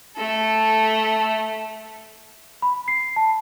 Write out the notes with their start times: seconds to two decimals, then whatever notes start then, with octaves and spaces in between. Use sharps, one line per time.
0.17 A3 A4
2.62 B5
2.88 C7
3.16 A5